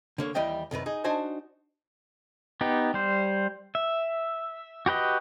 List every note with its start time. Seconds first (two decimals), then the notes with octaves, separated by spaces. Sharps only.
0.18 D3 A#3 C#5
0.35 D#2 E3 G3 G4 D#5 G5
0.71 C2 F#2 D#3 B4
0.86 D#4 G#4
1.04 D4 D#4 F#4 C5 G#5 A5
2.61 B3 D#4 G4
2.94 G3 C5
3.75 E5
4.86 F#4 G4 B4 D#5